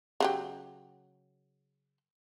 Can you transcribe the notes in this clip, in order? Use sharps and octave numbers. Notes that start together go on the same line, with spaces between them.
C#3 F#3 G4